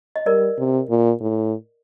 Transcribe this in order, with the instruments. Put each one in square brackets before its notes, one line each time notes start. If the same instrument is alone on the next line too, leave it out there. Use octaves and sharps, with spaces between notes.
[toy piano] D#5
[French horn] G3 [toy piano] A#4 D5
[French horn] C3
A#2
A2